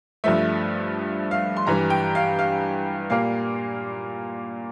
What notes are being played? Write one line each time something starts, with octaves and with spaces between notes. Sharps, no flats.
G2 F3 A3 E5
F5
C6
G2 E3 G3 A#5
G5
F5
F5
A#2 G3 A#3 F5